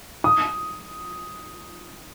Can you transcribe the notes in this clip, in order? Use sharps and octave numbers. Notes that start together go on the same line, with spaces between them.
D#6